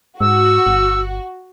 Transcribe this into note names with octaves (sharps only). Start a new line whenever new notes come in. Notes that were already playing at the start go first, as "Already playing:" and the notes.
G#2 F#4 E6
G1